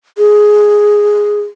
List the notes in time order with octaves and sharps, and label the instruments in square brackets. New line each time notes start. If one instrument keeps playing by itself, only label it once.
[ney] G#4